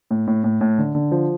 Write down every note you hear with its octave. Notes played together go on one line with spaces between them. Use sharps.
A2
A2
A2
A2
D3
D3
F3